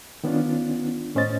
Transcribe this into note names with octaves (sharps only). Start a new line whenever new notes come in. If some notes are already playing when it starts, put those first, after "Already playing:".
D#3 B3 C#4 D4 F4
A2 C#4 C5 D#5 A6